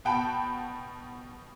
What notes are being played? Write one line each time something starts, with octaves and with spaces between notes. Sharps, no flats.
B2 F#5 G5 A5 B5